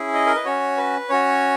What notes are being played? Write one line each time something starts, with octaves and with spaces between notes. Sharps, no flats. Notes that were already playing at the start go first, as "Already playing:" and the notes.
Already playing: C#4 E4 G#4
D#5
A#4
B4
C#4 F#4 C#5
B4
C#4 F#4 C#5